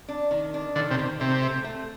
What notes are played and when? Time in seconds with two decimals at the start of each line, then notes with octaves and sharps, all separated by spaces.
0.08 D4
0.31 D#3
0.54 D4
0.76 D3 D#3
0.91 C3
0.99 D#3
1.20 C3 A3
1.43 A3
1.64 A3